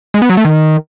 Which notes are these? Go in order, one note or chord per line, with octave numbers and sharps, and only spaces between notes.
G#3
B3
F#3
A3
D#3